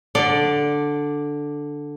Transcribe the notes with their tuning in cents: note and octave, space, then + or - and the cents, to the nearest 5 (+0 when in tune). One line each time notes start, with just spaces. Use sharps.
D3 +0 D5 +0